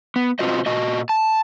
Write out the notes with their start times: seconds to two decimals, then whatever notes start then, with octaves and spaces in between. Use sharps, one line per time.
0.16 B3
0.39 B2 C4 F4 F#4 C5 D#5
0.66 A#2 F#4 D#5
1.09 A5